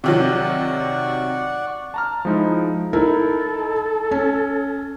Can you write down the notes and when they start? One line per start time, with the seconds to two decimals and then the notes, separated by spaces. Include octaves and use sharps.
0.04 C3 D#3 F#3 D5 F#5 C#6
1.94 A5 A#5 F6
2.25 F3 G#3 D#4 E4
2.93 D#4 E4 A4 A#4
4.11 C#4